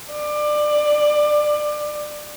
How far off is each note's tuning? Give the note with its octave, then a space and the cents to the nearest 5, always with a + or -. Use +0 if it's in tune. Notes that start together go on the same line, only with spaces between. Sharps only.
D5 +20